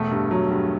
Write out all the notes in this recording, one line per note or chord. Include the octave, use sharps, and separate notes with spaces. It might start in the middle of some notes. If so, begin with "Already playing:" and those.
Already playing: E1 A3
G2
F#3
G2